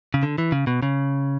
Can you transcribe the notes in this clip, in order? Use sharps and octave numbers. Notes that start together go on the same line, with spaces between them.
C#3
D3
E3
C#3
B2
C#3